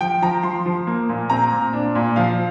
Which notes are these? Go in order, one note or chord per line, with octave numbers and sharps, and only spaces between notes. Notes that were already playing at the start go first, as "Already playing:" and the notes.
F3 G5
F3 A#5
F3 C6
F3
A#3
A#2
C4 A#5
A#2
D4
A#2
F3 F5